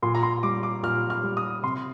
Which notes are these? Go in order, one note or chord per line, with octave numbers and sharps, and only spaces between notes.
A#2 C6
A#5
C6
G3 D6
D6
A#2 F6
F6
G3
D#6
C3 C6